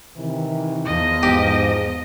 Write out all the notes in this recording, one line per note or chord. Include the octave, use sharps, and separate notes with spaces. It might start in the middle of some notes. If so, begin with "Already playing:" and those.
C3 D#3 E3
E2 F3 D#5
G#2 G4